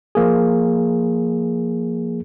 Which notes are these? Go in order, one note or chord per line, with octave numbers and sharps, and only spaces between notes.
F3 A#3 G#4